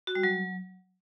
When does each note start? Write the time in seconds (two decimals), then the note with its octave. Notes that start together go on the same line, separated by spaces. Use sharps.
0.07 F#4
0.15 G3
0.23 F#3